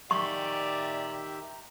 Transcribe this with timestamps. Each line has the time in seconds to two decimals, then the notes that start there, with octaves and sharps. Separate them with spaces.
0.11 D#3 G4 D5 E5 A#5 C6 C#6